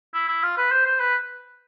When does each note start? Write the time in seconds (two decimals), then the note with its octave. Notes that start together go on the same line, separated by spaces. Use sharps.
0.14 E4
0.28 E4
0.43 F4
0.57 B4
0.71 C5
0.86 C5
1.00 B4